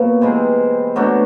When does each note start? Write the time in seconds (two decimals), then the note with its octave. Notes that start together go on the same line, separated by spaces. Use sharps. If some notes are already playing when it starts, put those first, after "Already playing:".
Already playing: A#2 F#3 B3 F5
0.21 C3 E3 G#3 C4
0.96 B2 F#3 A3 D4